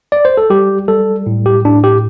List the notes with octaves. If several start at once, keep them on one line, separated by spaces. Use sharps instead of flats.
D5
C5
A4
G3 G4
G3 A4
A2
G4
A2 D4
G4